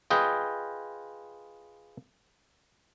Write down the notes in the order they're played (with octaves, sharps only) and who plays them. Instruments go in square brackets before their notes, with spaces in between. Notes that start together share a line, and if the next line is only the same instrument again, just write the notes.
[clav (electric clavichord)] F4 G#4 B4 D#5 G5